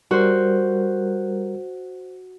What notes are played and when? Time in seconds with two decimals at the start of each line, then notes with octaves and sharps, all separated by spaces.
0.11 G3 F#4 A#4 C5